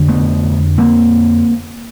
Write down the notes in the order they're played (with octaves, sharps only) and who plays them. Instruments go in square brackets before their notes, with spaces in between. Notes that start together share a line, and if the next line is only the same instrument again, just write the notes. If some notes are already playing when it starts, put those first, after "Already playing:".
Already playing: [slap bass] F2 D3
A3 B3
A#3 C4